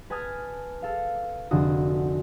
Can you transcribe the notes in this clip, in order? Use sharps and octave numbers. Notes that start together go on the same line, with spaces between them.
B4 G#5 A5 D#6 F6 G#6
A4 F5
F1 D3 F#4 D#6